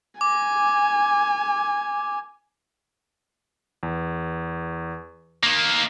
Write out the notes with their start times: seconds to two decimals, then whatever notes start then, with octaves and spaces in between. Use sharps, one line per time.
0.21 G#5 D6
3.83 E2
5.43 D#3 A#3 A#6